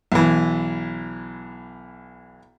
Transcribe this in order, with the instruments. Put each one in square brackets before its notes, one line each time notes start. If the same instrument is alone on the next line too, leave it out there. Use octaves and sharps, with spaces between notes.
[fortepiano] B1 E3